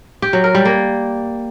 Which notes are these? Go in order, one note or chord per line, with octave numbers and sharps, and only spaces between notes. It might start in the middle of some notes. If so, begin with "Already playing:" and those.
G4
F#3
A#4
G3
A#3